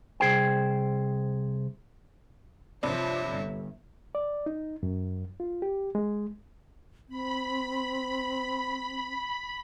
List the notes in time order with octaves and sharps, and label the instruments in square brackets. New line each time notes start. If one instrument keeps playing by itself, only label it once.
[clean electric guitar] C2 G#4 C5 G5
[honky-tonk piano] G2 C3 D4 [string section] F3 [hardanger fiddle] C#5 E5
[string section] G1
[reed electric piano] D5
D#4
F#2
F4
G4
G#3
[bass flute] C4 [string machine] B5